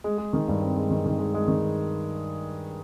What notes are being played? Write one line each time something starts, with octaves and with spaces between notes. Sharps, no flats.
G#3
G#3
D#3
G2
C4
G#3
D#3
D#3
G#3
G#3
D#3